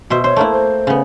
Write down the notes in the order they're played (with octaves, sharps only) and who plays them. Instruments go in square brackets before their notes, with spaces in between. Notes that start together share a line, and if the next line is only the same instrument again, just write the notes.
[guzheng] B2 C5 E5 [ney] F#4
[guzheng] C5 [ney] C#5
[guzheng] A3 A#3 E4
[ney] C5
[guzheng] C#3 B3